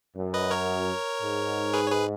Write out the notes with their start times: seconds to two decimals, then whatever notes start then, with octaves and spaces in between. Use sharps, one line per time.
0.16 F#2
0.34 B4 D#5
0.51 A#4 C#5
1.22 G#2
1.74 G#4 B4
1.87 C#5
1.91 G#4 B4